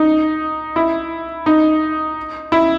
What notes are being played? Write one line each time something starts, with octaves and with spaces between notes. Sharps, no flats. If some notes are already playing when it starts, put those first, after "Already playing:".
Already playing: D#4
E4
D#4
E4